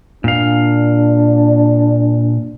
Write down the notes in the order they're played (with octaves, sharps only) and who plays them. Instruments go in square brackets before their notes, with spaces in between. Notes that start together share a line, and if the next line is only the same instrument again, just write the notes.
[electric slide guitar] A#2 F5 [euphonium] D4